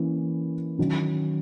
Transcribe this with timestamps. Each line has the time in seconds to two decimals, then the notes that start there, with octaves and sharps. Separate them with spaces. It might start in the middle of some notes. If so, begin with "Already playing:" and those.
Already playing: E3 A#3 C#4 E4
0.79 D#3 F#3 C#4